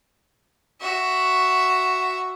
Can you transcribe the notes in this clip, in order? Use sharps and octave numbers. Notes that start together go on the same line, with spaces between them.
F#4 E5